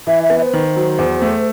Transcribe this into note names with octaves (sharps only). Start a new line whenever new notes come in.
E3 E5
E5
B3
E5
C5
D#3
F#3
E2
A3